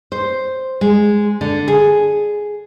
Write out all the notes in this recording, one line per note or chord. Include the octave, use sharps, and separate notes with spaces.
C5
G#3
D3
G#4